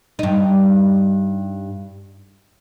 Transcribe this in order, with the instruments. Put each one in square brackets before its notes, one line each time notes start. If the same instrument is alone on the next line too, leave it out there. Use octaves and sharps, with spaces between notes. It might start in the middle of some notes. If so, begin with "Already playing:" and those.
[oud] G2 D#4